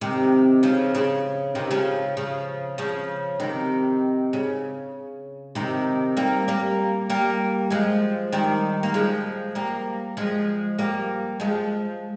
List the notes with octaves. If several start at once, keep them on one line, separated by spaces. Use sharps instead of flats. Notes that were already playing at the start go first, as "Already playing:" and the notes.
C3 D#3
C#3 F3
C#3
C3 D#3
C#3 F3
C#3 F3
C#3 F3
C3 D#3
C#3
C3 D#3
G3 A#3
G3 A#3
G3 A#3
F3 G#3
D#3 G3
A#3
F3 G#3
G3 A#3
F3 G#3
G3 A#3
F3 G#3